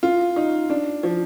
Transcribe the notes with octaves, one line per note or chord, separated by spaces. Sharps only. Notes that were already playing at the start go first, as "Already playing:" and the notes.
F4
D#4
D4
F3